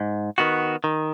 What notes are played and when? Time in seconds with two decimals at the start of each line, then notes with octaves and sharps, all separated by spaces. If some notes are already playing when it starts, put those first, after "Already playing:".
Already playing: G#2
0.38 D#3 B3 F#4
0.84 D#3